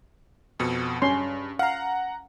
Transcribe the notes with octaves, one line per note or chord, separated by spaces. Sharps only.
F2 B2 C#7
G2 C#4 C6
F5 F#5 A#5